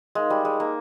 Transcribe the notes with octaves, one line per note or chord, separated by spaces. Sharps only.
G#3 D#4 A#4 F5
G3
G#3
A#3